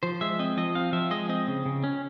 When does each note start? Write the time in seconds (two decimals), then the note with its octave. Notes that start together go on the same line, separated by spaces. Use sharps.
0.03 F3 C5
0.21 G#3 E5
0.39 C4 D#5
0.57 F3 D#5
0.75 C4 F5
0.93 F3 E5
1.11 G#3 D#5
1.29 C4 D#5
1.48 C#3
1.66 C#3
1.84 C#4